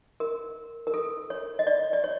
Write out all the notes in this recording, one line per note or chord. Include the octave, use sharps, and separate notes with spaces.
A#4
A#4
A4
C#5
D#5
D5
D5
C#5